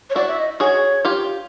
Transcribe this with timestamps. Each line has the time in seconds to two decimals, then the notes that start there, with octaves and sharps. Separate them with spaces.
0.10 C#5
0.15 E4 F#4 D5
0.28 E5
0.39 D#5
0.60 F#4 G#4 C#5
1.05 F4 G4